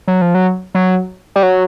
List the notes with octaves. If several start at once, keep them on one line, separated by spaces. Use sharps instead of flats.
F#3
F3
F#3
F#3
G3
F#3